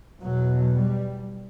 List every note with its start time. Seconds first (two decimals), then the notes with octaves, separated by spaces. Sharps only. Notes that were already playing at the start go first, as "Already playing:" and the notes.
0.21 E2 B2 F#3
0.77 G3